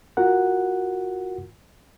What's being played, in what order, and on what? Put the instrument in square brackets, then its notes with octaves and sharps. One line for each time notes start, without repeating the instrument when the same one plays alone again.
[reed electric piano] F4 F#4 A#4 F#5